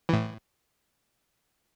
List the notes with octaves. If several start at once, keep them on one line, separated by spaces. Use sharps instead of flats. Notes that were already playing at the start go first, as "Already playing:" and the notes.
A2 E3